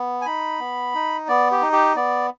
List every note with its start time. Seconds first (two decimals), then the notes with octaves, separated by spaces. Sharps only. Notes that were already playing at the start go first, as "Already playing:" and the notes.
Already playing: B3
0.22 G#5
0.26 D#4 B5
0.60 B3
0.94 D#4
1.28 B3 D5
1.51 G4
1.62 D#4
1.73 G4
1.96 B3 D5